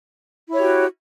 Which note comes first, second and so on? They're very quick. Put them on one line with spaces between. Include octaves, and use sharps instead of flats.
E4 C#5 G4 F#4